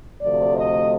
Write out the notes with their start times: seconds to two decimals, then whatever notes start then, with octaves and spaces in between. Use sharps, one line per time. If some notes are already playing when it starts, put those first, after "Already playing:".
0.21 D2 C3 F3 A3 D5
0.55 D#5